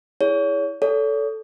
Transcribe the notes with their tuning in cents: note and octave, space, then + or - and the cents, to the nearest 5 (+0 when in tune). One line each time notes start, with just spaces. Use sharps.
E4 +0 G#4 +0 C#5 +35
A4 +0 C#5 +40